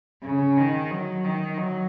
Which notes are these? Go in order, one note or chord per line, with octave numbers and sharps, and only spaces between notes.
C#3
D#3
F#3
D#3
F#3